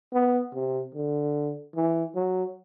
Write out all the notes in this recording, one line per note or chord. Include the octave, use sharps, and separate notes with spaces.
B3
C3
D3
E3
F#3